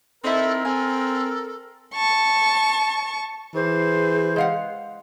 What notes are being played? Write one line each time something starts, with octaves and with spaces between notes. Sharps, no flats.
C4 D#4 E4 A4 A#4
C4 A4 G#5
A5 C#6
E3 G#4 C5
G#3 F5 F#5